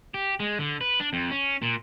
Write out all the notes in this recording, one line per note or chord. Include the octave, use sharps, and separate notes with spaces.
G4
G#3
D3
B4
D4
F2
C#4
A#2